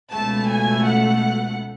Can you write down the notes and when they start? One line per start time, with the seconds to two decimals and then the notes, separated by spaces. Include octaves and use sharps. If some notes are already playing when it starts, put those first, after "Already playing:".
0.11 C#2 B2 A3 A5
0.48 G#5
0.85 F#5